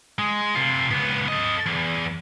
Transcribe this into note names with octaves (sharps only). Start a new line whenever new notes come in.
G#3
C3 F4
C#2 B3
A4 D#5
E2